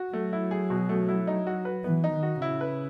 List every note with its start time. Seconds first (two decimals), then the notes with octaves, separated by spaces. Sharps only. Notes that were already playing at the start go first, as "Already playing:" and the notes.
Already playing: F#4
0.13 F#3 A3
0.33 E4
0.51 G#4
0.70 B2
0.89 A3
1.08 E4
1.27 D#4
1.47 F#4
1.65 B4
1.84 E3 B3
2.04 D#4
2.13 D#3
2.23 F#4
2.41 C#3 E4
2.61 B4